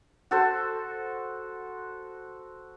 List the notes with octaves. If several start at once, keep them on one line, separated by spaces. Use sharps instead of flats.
F#4 A4 C5